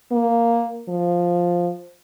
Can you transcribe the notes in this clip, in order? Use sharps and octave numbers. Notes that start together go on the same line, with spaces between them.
A#3
F3